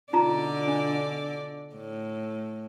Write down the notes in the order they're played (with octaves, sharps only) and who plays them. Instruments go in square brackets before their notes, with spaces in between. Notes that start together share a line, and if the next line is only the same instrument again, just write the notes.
[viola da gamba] B2 D3 D5 [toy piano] D#4 F4 A#5
[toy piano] D4
[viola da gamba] A2